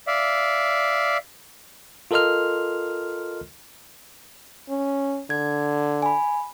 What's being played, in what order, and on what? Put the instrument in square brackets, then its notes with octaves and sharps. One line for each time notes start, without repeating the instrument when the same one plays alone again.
[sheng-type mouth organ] D5 E5 F5
[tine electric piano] F4 A4 A#4 D#5 C6 F6
[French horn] C#4
[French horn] D3 [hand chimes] G#6
[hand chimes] G#5 B5